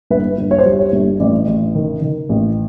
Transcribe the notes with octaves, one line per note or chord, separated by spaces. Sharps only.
G1 B4
G1
C#5
C5
G3
C#5
G1
A1 D5
A1
D#3
D#3
A1